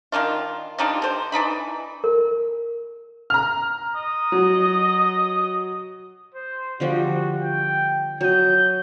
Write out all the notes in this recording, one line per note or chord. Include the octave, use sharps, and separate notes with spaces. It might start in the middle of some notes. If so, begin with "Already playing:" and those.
D#3 F3 D4 F4
G3 D4 D#4 F4
D3 C5
E3 D4 D#4 B5
A#4
A#5 F6
D#5
F#3
C5
D3 F3 G3 F#4
G5
F#3 D#5 G6